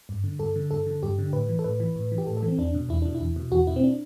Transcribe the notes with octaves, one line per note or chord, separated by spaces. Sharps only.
G2
D3
G2 A4
D3
G2 A4
D3
G2 G4
D3
A2 B4
E3
A4
A2 B4
E3
A2
E3
G4
A2 A4
A4
E3
C4
E2 D4
B2
E2 E4
B2 D4
E4
E2
B2
E2 F#4
B2 E4
C4
D4